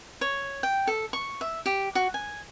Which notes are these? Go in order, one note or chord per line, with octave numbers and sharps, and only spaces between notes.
C#5
G5
A4
C#6
E5
G4
F#4
G#5